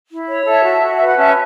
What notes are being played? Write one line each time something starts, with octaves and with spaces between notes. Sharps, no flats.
E4
C#5
A4 E5 A5
F#4
F#4
B4 E5
F#5
C#4 E5 A5